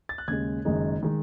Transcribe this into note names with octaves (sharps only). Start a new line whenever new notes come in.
A6
F#6
D#2 C#3 G#3 G#6
F#1 F#2 D#3 G#3 D#4
D#3 G#3 D#4